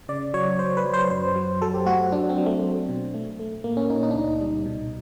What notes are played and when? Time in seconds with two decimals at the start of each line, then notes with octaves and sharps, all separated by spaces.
0.09 C#3 D5
0.34 F#3 C#5
0.59 F#3 C5
0.77 B4
0.85 F#3
0.93 C5
1.10 F#2 C5
1.36 F#3
1.61 F#3 A4
1.74 G4
1.86 A3 F#4
2.12 F#3 D4
2.29 C4
2.38 F#3
2.46 A3
2.62 A3
2.89 B2
3.14 A3
3.39 A3
3.64 A#2 A#3
3.77 C#4
3.90 A#2 D#4
4.03 D#4
4.11 D4
4.15 C#2 D#4
4.41 G3
4.65 B2